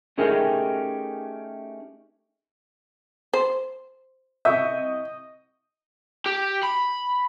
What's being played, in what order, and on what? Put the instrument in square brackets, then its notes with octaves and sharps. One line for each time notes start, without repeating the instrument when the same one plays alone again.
[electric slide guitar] A3 C#4 D#4 G4 G#4 A#4
[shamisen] C5
[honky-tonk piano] C2 C#6 G6 [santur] D#5 [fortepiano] E5
[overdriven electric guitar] G4
B5